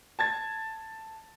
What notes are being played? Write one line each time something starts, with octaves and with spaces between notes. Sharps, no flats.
A5 G#6 A6